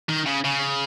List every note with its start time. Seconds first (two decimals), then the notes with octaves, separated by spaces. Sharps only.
0.09 D#3
0.26 C#3
0.44 C#3